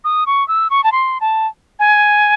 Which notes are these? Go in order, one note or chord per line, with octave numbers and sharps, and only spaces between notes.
D#6
C#6
E6
C#6
A5
C6
A5
G#5